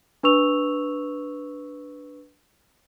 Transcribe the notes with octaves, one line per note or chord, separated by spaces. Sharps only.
D4 B4 C#6 E6 F7